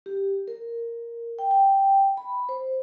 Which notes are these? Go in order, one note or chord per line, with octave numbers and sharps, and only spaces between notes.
G4
A#4
G5
G5
B5
C5